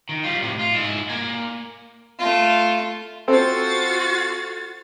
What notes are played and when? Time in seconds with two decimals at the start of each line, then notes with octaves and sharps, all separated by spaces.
0.09 D#3
0.24 G3 F4
0.42 A2 C3
0.59 F4
0.74 G#2 E4
1.09 A#3 G#5
2.19 A3 F4
3.28 C4 F4 F#4 A4 C5 A6